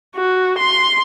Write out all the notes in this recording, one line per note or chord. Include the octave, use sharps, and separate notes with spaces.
F#4
C6